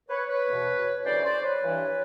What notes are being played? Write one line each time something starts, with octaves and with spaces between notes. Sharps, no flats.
B4 C#5
B4 C#5
E2 B2
D2 C#3 E3 C5 D5
C5 D5
B4 C#5
G2 E3